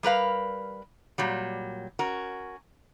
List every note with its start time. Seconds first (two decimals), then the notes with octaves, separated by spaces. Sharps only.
0.03 G3 A#4 B4 F5
1.18 A#2 F#3 G3
1.99 C#4 F#4 A#4